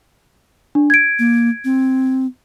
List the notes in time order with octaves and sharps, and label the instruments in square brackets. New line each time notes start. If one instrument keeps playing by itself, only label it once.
[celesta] D4
G#6 D7
[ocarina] A#3
C4